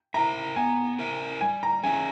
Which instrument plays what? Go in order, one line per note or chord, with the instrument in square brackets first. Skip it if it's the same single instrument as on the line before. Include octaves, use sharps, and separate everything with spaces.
[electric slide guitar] E4 A#4 E5 [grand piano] A#5
[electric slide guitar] B3 [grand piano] G#5
[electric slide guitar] E4 A#4 E5
[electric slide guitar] G3 [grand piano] G#5
[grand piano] A#5
[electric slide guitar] C#4 G#4 C#5 E5 [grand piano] G#5